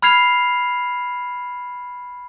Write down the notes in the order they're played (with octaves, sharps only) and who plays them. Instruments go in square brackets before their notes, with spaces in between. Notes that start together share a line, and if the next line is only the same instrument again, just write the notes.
[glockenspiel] B5 F6 G#6 C7 F7